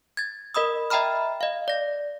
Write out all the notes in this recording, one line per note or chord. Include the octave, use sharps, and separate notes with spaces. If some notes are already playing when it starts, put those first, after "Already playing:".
G#6 A6
A#4 D#5 B5 D#6 E6
D#5 E5 G5 A#5 B5 F6
D#5 F5
D5 A#6